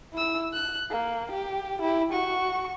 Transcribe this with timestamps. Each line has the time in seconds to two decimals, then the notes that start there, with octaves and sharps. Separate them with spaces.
0.13 E4 E6
0.53 F#6
0.90 A#3
1.31 G4
1.81 E4 G4
2.12 F#4 C#6